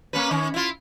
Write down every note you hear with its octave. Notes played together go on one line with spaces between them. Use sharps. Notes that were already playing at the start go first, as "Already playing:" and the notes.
A#3 C#4 B4
D#3 C#4
E4 F4